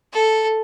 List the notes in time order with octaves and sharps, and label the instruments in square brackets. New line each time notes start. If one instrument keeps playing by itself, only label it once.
[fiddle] A4